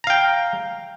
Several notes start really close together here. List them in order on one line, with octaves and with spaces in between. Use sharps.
A#5 F5 G5